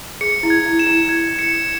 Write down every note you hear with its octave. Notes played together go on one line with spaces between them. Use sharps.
G#4 C#7
E4
G#6
E4
E7
E4
G#6
C#7